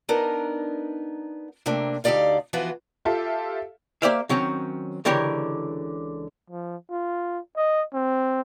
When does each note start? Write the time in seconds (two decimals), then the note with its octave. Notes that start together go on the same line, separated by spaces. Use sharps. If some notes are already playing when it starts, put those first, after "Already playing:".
0.09 B3 D4 D#4 A#4
1.66 C3 A3 A#3 C4 D4
2.04 D2 D3 D#4 G4 D5 F5
2.53 E3 F3 B3 F4 F#4
3.05 F4 G4 A4 E5 F5
4.02 A#3 G4 C5 D5 E5 F5
4.29 D#3 F#3 C4 C#4
5.05 C#2 D3 E3 G4 A#4 C#5
6.50 F3
6.90 F4
7.57 D#5
7.94 C4